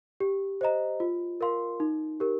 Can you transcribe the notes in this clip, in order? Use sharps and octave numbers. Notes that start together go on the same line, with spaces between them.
G4
C5 D#5 A#5
F4
A#4 F5 C6
D#4
G4 A#4